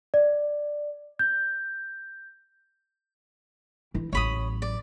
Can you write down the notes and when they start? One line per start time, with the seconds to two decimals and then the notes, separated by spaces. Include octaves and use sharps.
0.14 D5
1.19 G6
3.94 E3 E4
4.13 A1 F#3 C#5 B5 D#6
4.62 D5